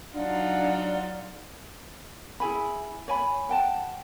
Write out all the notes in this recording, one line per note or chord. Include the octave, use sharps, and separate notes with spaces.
F#3 D4 D#4 F4 D5 F5 F#5
E4 G#4 G#5 B5
C#5 G#5 B5
F#5 G5 A5